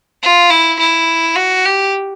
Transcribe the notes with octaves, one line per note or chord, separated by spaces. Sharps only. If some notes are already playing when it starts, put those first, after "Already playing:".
F4
E4
E4
F#4
G4